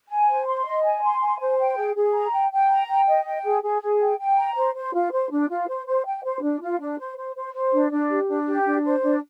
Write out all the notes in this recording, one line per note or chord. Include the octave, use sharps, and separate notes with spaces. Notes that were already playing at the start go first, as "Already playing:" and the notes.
G#5
C5
C6
D#5
G#5
C6
G#5
C5
G5
G#4
G#4
A#5
G5
G5
A#5
G5
D#5
G5
G#4
G#4
G#4
G5
G5
A#5
C5
C5
F4
C5
D4
F4
C5
C5
G5
C5
D4
F4
D4
C5
C5
C5
C5
D4
D4
G4
D4
G4
D4
C5
D4